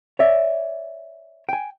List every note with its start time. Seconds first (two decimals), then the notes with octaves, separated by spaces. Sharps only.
0.19 C#5 D5 E5
1.49 G5 G#5